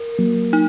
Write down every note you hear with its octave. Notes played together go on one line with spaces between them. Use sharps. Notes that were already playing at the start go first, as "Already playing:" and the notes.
Already playing: A#4
F#3 A#3
D#4